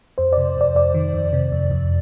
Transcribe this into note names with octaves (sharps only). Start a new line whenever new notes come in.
F2 C5
C3 D5
F2 D5
F2 D5
D#3
F2
C3
F2
F2